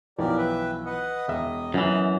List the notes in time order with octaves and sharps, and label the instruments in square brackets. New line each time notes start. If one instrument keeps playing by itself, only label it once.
[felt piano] B1 E3 F3 [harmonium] G4 A#4 D5
[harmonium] B4 E5 G5
B4 D#5 F#5
[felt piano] E1 E5 [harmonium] D#5
[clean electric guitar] F#2 E3